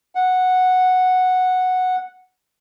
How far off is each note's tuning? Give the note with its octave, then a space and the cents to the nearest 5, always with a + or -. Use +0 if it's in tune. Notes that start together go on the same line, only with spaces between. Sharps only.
F#5 -5